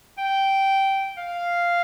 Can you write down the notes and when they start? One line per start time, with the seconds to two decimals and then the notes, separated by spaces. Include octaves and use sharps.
0.18 G5
1.17 F5